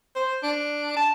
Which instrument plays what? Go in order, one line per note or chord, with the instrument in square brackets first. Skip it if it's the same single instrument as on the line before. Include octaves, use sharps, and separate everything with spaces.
[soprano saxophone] C5
D4
A5